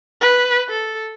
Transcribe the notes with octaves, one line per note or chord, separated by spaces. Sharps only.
B4
A4